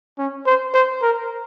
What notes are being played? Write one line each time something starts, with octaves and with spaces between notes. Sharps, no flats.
C#4
C5
C5
A#4